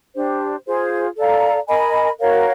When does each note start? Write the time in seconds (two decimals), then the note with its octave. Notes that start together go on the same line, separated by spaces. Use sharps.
0.15 D4 G4 C5
0.66 F4 G#4 C5
1.17 A4 D5 F5 A#5
1.68 A#4 D#5 G#5 B5
2.20 F#4 A#4 C#5 F5